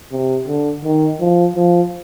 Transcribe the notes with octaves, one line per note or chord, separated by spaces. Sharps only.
C3
D3
D#3
F3
F3